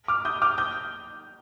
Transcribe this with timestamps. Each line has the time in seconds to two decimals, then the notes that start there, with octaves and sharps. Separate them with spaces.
0.08 D6 F6
0.25 D#6 G6
0.42 D6 F6
0.58 D#6 G6